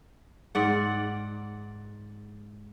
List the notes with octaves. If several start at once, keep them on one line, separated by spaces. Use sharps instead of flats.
G#2 D5 F#5